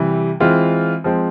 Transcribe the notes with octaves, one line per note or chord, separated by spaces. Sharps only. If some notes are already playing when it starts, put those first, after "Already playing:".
Already playing: C3 E3 G3
E3 G#3 C4 F4
F3 G#3 C4